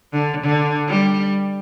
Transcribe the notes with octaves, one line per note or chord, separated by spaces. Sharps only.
D3
D3
G3